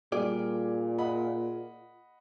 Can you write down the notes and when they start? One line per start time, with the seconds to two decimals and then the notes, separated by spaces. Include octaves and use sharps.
0.12 A#2 G3 F4 G#4 D5
0.98 D#5 F#5 B5